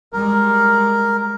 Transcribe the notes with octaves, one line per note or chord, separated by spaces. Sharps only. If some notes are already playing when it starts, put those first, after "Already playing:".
G3 G#3 A#4